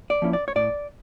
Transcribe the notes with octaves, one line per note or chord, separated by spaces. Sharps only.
D5
F3 A#3 C#4 E4
D5
C#5
A2 D5